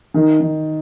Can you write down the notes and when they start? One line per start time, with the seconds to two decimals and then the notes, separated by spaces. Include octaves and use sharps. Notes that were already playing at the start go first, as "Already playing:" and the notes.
0.14 D#3
0.40 D#3